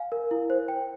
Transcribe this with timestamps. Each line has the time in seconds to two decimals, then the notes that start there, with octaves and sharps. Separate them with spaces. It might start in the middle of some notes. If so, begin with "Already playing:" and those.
Already playing: F5 G#5
0.12 A#4
0.31 E4
0.50 C5
0.68 G5